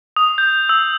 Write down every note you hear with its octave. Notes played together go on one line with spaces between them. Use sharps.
D#6
G6
E6